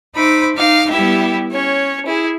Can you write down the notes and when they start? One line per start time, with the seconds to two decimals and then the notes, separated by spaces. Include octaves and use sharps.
0.15 D#4 C5 E5 B5 D6
0.55 D#4 F5 D6
0.89 G3 B3 E4 G4 E5
1.51 C#4 C#5
2.06 E4 G#4